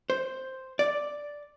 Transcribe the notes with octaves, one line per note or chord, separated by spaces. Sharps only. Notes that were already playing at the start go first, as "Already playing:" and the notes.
C5
D5